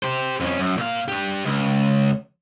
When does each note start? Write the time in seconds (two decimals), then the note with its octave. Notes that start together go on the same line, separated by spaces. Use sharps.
0.03 G4 C5
0.40 F2 C#4
0.59 F#2
0.78 A#2 F5
1.08 D4 G4
1.45 C#2